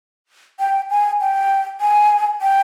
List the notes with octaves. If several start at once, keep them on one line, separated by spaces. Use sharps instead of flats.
G5
G#5
G5
G#5
G5